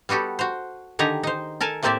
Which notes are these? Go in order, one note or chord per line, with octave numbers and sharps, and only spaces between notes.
G3 B3 F#4 G4 A4
F#4 C5
D3 D#3 G4 G#4 A#5
D#4 C5
A4 A#4 G#5 A5
A2 A#3 C4 G4 D5 E5